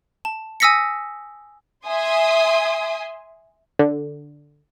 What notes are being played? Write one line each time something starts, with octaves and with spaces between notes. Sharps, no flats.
A5
G#5 D#6 E6 A#6 B6 C#7
E5 G#5 C6 D#6
D3